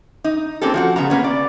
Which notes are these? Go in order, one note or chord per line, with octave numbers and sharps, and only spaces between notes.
D#4
A#3 C4 C#4 G4 A4
F3 F#4 F#5
C#3 G3 B3 A#5
A#3 B3 C#4
D5